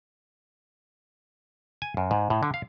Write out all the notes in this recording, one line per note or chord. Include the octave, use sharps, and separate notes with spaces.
G#5
F#2
G#2
A2
D3
F5